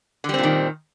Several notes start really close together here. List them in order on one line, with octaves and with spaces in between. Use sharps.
D3 G3 C4 A#2 D#3